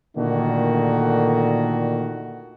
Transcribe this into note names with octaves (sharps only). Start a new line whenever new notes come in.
A#2 D3 D#3 A3 F#4